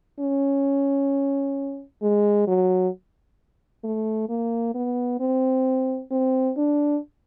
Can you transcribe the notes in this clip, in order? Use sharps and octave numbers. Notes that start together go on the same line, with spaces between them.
C#4
G#3
F#3
A3
A#3
B3
C4
C4
D4